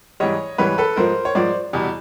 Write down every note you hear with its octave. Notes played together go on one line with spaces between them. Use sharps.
G#2 E3 G3 C#5 D#5
G#2 E3 G3 B4 C#5
A4 B4
G#2 F3 A#4 C5
C#5
G#2 F3 C5 D5
E2 B2 G3